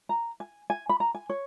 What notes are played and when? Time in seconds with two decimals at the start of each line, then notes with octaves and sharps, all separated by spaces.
0.09 A#5
0.40 G#5
0.70 G#5
0.89 B5
1.00 A#5
1.15 G#5
1.30 C#5